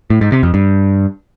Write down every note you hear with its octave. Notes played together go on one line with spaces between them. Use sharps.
A2
G#2
C3
F2
G2